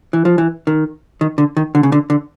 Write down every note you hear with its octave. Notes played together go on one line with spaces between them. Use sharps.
E3
F3
E3
D#3
D#3
D3
D#3
D3
C#3
D3
D3